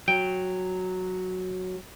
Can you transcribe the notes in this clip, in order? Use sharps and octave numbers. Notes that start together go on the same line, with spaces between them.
F#3 G5